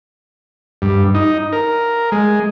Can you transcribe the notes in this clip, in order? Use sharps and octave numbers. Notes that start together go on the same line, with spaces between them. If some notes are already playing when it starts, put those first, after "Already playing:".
G2
D#4
A#4
G#3